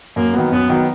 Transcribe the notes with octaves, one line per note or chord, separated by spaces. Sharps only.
F#2 A#3
D#3 F#3 B3
F#2 B3
D#3 F#3 B3